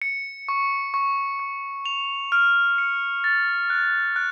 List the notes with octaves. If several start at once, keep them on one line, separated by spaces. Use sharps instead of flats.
C#7
C#6
C#6
C#6
F7
F6
C#7
A6
F#6
F#6